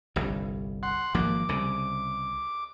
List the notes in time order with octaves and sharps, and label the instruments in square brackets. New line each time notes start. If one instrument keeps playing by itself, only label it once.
[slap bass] G1 C2 G2
[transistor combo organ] F#5 C6
[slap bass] G#1 F3 A#3 [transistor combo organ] D6
[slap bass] C2 C#3